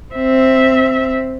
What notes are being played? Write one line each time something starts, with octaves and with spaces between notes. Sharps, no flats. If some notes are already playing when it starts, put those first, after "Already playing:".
C4 E5